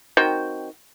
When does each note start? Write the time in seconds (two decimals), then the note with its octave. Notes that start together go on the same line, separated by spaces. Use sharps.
0.17 D#3 C4 F#4 G5